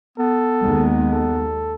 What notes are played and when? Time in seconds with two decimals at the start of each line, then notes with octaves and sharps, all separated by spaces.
0.18 B3 A4
0.62 D#2 G#3
1.12 A4